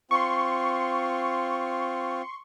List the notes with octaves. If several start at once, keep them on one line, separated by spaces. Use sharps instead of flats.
C4 F4 C6 C#6